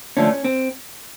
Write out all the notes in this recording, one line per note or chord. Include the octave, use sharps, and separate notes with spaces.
D3 F3 A3 C#4
C4